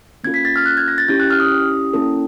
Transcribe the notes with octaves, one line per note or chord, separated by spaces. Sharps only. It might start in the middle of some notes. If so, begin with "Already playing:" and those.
A#3 C#4 F4 A4 G#6
B6
A6
F6
F#6
G#6
A#6
A6
C#4 E4 G4 G6
F#6
F6
D#6
A#3 C#4 E4 A4